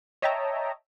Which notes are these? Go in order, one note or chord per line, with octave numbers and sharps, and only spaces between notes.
C#5 D#5 E5 G5 A5 A#5